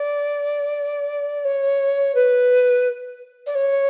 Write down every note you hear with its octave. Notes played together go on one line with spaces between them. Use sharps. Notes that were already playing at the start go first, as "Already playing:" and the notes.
Already playing: D5
C#5
B4
D5
C#5